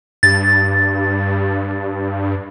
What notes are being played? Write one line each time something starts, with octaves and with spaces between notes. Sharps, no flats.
G2 A6